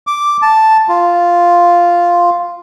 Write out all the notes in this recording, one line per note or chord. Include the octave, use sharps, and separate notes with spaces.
D6
A5
F4